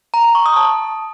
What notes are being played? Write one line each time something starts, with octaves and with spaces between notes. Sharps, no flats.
A#5
A#5
C#6
D#6
A5